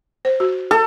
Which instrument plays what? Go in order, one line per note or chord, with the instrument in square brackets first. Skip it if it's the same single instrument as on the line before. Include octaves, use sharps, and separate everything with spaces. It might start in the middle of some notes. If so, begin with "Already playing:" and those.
[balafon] C5
F#4
[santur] A4